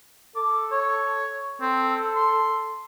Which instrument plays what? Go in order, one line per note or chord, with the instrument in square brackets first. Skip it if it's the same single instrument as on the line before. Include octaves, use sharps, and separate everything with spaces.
[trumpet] A4 [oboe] D6
[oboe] C#5
[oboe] C4 [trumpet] A4
[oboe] C6